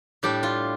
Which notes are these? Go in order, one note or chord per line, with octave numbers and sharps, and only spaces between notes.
A2 G3 D4 G4
F4